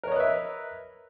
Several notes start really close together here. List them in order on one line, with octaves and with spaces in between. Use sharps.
A#4 C#5 D#5 B4 E5